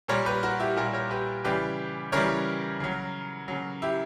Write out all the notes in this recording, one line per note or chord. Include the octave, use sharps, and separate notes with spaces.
A#2 G3 A#4 C#5
G4 B4
F#4 A#4
E4 G4
A#2 G3 F#4 A#4
A#4 C#5
G4 B4
C#3 E3 G3 G4 B4
C#3 E3 G3 A#4 C#5
C#3 F#3
C#3 F#3
E4 G4